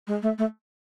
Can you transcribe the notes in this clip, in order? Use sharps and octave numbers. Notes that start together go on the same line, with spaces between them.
G#3
A3
A3